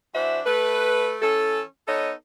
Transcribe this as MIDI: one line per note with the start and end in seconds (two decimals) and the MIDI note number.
0.15 0.41 52
0.15 0.41 62
0.15 0.41 66
0.15 0.41 72
0.15 0.41 76
0.46 1.17 57
0.46 1.17 71
1.22 1.62 52
1.22 1.62 61
1.22 1.62 69
1.88 2.12 59
1.88 2.12 63
1.88 2.12 69
1.88 2.12 73
1.88 2.12 75